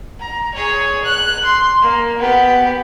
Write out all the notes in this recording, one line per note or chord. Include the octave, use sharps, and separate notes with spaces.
A#5
G#4 C#5
F#6
C6
A#3
B3 G4